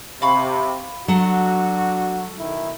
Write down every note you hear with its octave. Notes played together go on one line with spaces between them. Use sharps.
C3 F5 B5 C#6
F#3 D4 F#4 A4 F#5
B1 D#3 E4